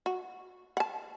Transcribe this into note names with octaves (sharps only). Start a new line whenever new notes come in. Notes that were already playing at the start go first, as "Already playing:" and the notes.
F#4
F#5 A5